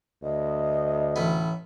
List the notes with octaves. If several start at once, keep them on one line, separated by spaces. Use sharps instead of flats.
D2 D#5
A1 B3